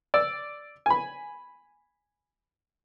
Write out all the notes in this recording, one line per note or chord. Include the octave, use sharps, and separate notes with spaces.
D5 E6
G#5 B5